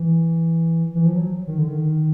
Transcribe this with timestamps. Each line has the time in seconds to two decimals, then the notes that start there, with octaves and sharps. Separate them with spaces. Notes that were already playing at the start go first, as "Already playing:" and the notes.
Already playing: E3
0.95 E3
1.05 F3
1.16 F#3
1.47 D#3
1.58 D3
1.68 D#3